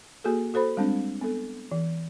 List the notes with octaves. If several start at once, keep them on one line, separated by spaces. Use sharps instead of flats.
A#3 F#4 G#4 A4
F#4 A4 C5 B5
G3 G#3 C4 D4
B3 A4
E3